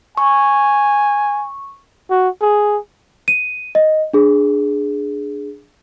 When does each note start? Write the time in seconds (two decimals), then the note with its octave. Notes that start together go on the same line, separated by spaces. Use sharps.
0.17 G#5 C#6
2.10 F#4
2.41 G#4
3.28 D#7
3.75 D#5
4.13 D4 G#4